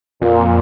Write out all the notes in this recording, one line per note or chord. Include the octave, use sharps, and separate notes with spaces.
F2 A#2